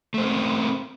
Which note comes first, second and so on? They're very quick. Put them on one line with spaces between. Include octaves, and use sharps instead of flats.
A3 C5 A#4 C4